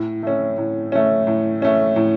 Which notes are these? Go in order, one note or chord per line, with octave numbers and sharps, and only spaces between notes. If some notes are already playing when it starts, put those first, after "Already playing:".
Already playing: A2
A3 C#4
A2
A3 C#4
A2
A3 C#4
A2